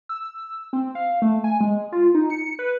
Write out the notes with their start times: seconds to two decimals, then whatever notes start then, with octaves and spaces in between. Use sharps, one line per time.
0.09 E6
0.73 C4
0.95 F5
1.22 A3
1.44 G#5
1.61 G#3
1.92 F4
2.15 D#4
2.30 C#7
2.59 B4